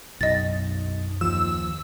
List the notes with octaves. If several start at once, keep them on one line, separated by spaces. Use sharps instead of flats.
B1 F#2 D#4 D#5 A6
D#2 F3 E6